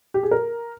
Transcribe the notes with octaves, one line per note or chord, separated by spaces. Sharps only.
G4
G#4
A#4